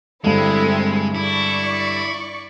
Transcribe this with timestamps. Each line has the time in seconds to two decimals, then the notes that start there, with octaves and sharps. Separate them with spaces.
0.24 G2 D3 G#3 C4 E4 A4
1.15 E4 D5 C#6